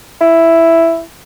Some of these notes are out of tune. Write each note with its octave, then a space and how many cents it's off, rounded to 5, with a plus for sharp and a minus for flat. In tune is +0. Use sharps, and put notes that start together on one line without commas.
E4 +5